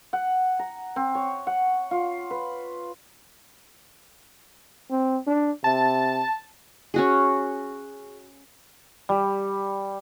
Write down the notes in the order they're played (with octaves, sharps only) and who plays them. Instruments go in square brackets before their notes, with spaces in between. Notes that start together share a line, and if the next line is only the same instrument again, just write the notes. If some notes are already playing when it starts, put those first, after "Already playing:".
[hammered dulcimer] F#5
A#5
C4
C#5
F#5
F4
B4
[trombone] C4
D4
[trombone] C3 [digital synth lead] A5
[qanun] C#4 F#4 G#4
[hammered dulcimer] G3